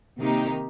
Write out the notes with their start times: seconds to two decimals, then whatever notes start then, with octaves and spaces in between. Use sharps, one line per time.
0.21 C3 D#3 A#3 D#4 G4